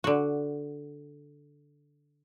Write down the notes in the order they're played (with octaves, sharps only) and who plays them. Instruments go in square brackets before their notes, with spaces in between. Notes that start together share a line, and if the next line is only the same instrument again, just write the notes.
[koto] D3 F#4